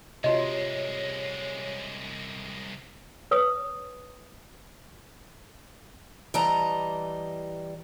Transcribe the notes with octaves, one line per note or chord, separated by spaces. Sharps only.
C2 C3 G#3 F4 F#4 C#5 D#5
B4 C#5 D#6
E3 G3 D#5 A5 A#5